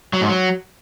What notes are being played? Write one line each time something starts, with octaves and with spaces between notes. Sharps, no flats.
F#3
G#2
F#3